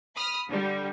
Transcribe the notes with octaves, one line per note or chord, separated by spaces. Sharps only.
B5 D#6 F6
D3 G3